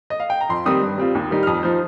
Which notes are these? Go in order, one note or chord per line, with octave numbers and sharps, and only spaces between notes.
D#5
F5
G5
A#5
F2 C6
D#3 G3 C4 D#4 D#6
G2
G3 C4 F4
D#2
D#3 G3 D#4
F6
F2 D#6
F3 D#4 C5